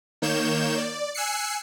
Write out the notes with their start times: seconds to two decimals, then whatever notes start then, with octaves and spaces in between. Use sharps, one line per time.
0.22 D#3 A#3 C#5 G6 E7
0.78 D5
1.14 G#5 E6 F#6 C7 C#7